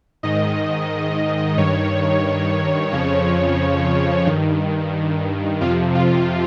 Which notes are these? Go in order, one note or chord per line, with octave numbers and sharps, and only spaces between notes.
G#2 D#3 D#5
G2 D#3 C#5
F2 C#3 F3 C#5
G2 D#3
F2 C3 F3 F4
F4